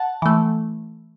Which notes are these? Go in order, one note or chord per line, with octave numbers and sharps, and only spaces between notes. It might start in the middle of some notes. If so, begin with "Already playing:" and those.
Already playing: F#5 A5
E3 A3